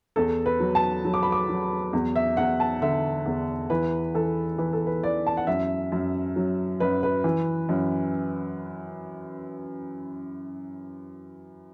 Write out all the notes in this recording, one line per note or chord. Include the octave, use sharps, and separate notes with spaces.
E2 A4
B4
F#3
A5
F#3
D6
B5
D6
F#3
E2
E5
E2 F#5
A5
D3 E5
E2
E3 B4
E3 A4
E3 B4
A4
B4
E3 D5
A5
F#5
F#2 E5
F#2
F#3
F#2 B4
B4
E3
F#2